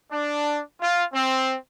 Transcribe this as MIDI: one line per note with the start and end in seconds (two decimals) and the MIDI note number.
0.11 0.61 62
0.81 1.03 65
1.13 1.56 60